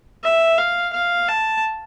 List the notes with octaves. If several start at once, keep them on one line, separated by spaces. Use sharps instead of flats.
E5
F5
F5
A5